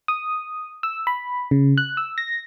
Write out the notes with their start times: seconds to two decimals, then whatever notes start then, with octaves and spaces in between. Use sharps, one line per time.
0.08 D#6
0.83 E6
1.07 B5
1.51 C#3
1.78 F#6
1.97 E6
2.18 A#6